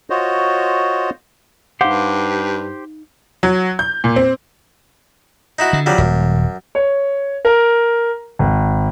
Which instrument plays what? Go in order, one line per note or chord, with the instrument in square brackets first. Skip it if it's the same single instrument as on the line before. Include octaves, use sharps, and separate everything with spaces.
[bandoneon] F4 F#4 C5 C#5 D#5
[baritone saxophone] G2 [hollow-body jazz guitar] D#4 F5 F#5 [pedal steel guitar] G4 C5
[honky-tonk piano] F#3
G6
A#2
C4
[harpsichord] D#4 E4 F#4
[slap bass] D3
[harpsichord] F2 F#3 G3
[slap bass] D#1 [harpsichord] F#2
[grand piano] C#5
A#4
G#1